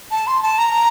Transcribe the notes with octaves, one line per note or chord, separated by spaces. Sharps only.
A5
C6
A5
A#5